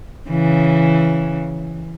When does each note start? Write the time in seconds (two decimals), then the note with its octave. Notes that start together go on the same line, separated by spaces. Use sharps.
0.30 C#3 E3